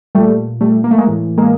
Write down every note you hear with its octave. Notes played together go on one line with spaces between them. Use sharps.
A#2 G3 A3
G3 A3
A#3
A3
G#3 A#3
A2 E3
G#3 A#3